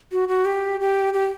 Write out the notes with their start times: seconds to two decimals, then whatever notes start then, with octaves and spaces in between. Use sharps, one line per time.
0.12 F#4
0.28 F#4
0.45 G4
0.80 G4
1.13 G4